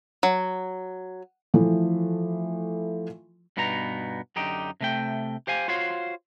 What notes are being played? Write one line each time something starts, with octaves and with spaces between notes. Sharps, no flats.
F#3
E3 F3 A3
G2 B2 B3 D#4 A#5
F#2 D3 D#4 G4
C3 A3 G5
G4 C5 F5 G#5
F4 F#4 C5 C#5 F5